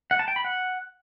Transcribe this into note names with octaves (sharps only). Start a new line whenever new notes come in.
F#5
A5
G5
B5
F#5